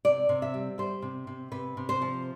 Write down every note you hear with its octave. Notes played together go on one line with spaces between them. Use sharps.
C3 D5
C3
E5
G3
G3 C5
C3
C3
C3 B4
C3
C5
F3